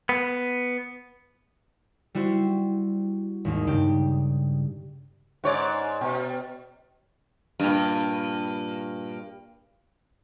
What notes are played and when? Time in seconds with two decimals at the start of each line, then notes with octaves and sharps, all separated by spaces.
0.09 B3
2.15 G3 E4 F#4 C5
3.45 G#1 D#2
3.67 G2 C#3 G4
5.44 G#2 C#5 D5
6.01 B2
7.60 G2 A#2